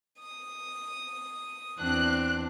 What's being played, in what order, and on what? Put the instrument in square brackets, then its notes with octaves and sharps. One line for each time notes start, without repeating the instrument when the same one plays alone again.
[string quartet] D#6
[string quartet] E2 C4 D4 [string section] F#6